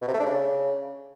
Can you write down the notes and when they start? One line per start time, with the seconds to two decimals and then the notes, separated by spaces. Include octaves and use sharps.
0.02 B2
0.08 C3
0.14 A3
0.20 D4
0.26 C#3